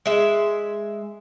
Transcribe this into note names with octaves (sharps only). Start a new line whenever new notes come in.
G#3 E5